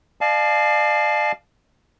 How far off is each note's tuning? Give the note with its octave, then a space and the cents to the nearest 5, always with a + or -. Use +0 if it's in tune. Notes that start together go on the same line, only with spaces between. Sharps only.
D5 +35 F5 -5 A5 -40